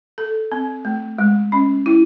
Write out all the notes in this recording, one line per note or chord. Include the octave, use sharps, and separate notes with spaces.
A4
C4
A3
G#3
C#4
E4